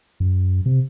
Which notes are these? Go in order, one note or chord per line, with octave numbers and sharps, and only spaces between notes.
F#2
C3